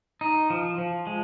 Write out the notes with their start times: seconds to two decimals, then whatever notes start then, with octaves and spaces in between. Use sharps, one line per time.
0.21 D#4
0.50 F3
0.78 F3
1.07 G#3